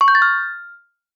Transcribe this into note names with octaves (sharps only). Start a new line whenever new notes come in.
C#6
G6
A6
F6